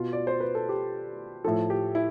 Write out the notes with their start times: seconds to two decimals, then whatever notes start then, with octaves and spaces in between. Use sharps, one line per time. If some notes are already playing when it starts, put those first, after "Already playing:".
Already playing: B2 F4
0.13 D5
0.27 C5
0.40 B4
0.55 A4
0.69 G4
1.44 A2 F3 A4
1.70 G4
1.95 E4